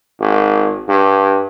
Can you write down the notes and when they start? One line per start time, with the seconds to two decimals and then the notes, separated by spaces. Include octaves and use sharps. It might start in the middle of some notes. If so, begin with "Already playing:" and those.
0.20 G#1
0.89 G2